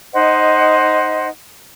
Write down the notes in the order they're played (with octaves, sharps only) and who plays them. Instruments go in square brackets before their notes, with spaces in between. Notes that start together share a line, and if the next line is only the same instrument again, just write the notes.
[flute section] D#4 C5 D#5 F#5